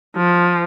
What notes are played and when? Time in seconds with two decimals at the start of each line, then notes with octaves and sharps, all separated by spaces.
0.17 F3